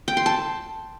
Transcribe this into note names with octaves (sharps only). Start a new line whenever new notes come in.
G5
C6
A5